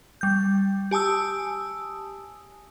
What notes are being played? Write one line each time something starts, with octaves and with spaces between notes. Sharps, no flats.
G3 G6
G4 G#5 A5 D#6 E6